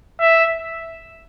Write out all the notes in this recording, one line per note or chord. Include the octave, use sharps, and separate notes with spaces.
E5